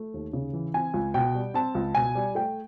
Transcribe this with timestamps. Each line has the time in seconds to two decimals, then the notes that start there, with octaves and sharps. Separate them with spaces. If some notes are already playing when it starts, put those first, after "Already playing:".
Already playing: A3
0.14 D#2
0.33 C#3
0.53 E3
0.74 C4 G#5
0.94 C#2
1.14 B2 G5
1.35 G3
1.54 C4 A5
1.75 C#2
1.95 B2 G#5
2.15 G3
2.35 A3 G5